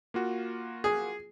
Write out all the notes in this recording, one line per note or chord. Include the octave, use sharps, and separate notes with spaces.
A#3 F4 F#4
G#4